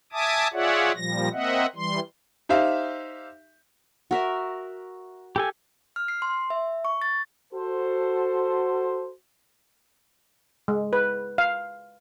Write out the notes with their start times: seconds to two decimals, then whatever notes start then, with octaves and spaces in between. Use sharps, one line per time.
0.13 E5 G#5 A5 D6 D#6
0.53 F4 G#4 C#5 D5 E5 F#5
0.96 A#2 F3 G3 A#6
1.33 A#3 C4 D#5 E5 F#5
1.76 E3 G3 C6
2.49 D#4 G4 C5 E5 F5
4.11 F#4 A#4 E5
5.36 G4 A4 G#5
5.96 F6
6.08 C7
6.22 C6
6.50 E5
6.85 C#6
7.02 A6
7.53 F#4 A4 C5
10.68 G#3
10.93 B4
11.38 F5